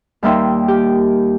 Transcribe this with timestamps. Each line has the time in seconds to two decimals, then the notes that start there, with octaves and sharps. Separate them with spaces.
0.23 D#2 G3 A#3 D#4 E5 C6
0.68 G4